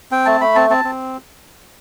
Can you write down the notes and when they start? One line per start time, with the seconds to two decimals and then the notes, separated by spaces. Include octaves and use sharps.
0.11 C4 G5
0.25 A3 A5
0.41 A3 B5
0.55 C4 A5
0.70 C4 A5
0.85 C4